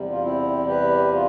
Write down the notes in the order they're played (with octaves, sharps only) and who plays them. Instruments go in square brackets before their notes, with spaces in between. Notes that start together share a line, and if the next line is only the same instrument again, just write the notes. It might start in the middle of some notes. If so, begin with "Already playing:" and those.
Already playing: [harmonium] E2 C3 G3
F4
C4 E4
G4 B4
F4